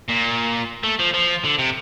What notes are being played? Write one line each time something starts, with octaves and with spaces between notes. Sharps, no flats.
A#2
A3
F3
F3
D3
C3